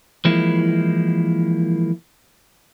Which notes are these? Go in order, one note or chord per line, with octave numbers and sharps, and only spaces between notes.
E3 F3 G#3 A#3 E4